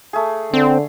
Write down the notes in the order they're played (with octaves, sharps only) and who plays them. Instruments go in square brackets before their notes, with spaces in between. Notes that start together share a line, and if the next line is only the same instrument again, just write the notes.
[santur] A3 G#4
[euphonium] D3 [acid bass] C4